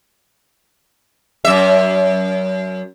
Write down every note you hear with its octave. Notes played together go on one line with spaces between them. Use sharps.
F#2 E5